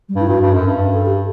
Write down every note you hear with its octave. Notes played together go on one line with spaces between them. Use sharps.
G3
G2
E4
G2 F#4
G2
F#2
G2
A4
G4